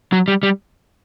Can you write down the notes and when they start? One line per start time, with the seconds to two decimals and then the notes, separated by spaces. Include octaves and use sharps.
0.13 F#3
0.28 G3
0.43 G3